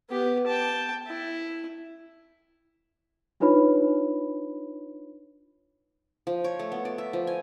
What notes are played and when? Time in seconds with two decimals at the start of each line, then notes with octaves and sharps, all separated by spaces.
0.10 B3 G4
0.47 G5 A5
1.07 E4
3.40 D4 D#4 F4 B4 C#5 B5
6.27 F3
6.44 C#5
6.59 A3
6.72 B3
6.85 D5
6.98 E5
7.13 F3
7.27 G#5